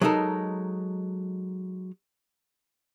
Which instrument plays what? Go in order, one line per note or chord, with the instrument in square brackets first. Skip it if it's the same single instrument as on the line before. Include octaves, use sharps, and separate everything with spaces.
[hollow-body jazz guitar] F#3 G#3 B3 D#4 A4 A#4